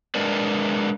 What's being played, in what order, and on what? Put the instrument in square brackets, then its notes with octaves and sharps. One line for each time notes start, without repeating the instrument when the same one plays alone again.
[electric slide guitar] G#3 D4 A#4 B4 D5